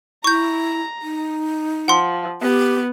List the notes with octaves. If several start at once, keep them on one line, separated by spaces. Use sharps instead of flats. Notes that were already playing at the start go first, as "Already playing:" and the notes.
E4 A#5 C#6 G6
D#4
F3 F#5 C6
B3 G4